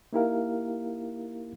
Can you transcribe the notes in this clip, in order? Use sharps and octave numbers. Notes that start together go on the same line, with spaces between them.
A#3 D#4 E4 G4 A#4 F5